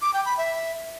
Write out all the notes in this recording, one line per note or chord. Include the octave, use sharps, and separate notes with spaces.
D6
G5
B5
E5